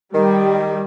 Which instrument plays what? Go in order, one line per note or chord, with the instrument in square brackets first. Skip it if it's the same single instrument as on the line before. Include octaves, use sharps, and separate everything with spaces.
[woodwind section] D#3 [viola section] G3